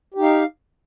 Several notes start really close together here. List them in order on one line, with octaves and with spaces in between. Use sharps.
G4 D#4 F5